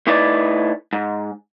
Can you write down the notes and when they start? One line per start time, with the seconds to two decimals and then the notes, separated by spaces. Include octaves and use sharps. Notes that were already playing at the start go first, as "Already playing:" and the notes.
0.07 A2 D#4 E4 B4 D5
0.93 G#2